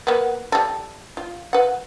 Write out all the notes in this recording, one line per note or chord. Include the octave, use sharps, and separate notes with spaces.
A#3 B3
G3 A4
F4
B4 F#5